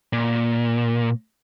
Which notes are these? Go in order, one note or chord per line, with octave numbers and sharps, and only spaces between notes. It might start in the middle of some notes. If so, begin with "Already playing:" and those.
A#2